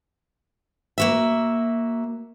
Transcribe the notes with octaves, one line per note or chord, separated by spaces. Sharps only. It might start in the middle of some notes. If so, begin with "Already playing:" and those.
A#3 F#4 E5